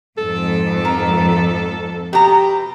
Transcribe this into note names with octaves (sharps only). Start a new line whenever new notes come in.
F2 G#2 A4
A#4
B2 G4 A#5